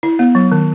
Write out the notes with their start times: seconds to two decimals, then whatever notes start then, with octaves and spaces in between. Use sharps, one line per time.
0.03 E4
0.19 B3
0.35 F#3
0.52 D#3